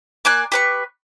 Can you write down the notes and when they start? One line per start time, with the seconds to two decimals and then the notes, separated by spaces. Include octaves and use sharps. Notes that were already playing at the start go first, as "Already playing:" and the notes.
0.25 A#3 D5 G#5 F#6
0.52 G4 B4 C#6